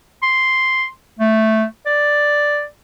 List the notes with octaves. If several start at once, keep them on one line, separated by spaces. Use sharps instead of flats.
C6
A3
D5